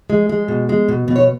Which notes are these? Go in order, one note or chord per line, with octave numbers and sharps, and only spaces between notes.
G#3
G#3
B2
G#3
B2
B2
C#5